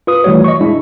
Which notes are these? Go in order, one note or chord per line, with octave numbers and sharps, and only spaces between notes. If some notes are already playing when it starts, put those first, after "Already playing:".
F4 B4 D#6
E3 G3 A3 F#4 C#5
D#5 C#6
G#3 D4 E4